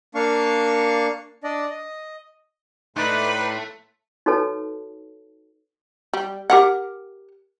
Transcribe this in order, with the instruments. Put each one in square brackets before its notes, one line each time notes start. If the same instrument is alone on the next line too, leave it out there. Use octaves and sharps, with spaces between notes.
[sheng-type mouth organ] A#3 D4 F5 C#6
D4 D5 D#5
D#5
[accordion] A2 C6 F#6 [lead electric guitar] A3 [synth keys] D#4 D5 D#5 [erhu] B4
[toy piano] D#4 F#4 A4 B4 C#5 A5
[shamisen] G3
G4 A#4 F#5